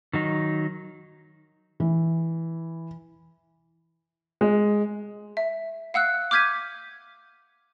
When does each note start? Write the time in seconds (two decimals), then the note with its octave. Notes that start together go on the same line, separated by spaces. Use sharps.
0.13 D#3 F#3 D#4
1.80 E3
4.41 G#3
5.37 E5
5.94 F5 F#5 E6 F#6
6.31 D6 F6 G6 G#6 B6 D#7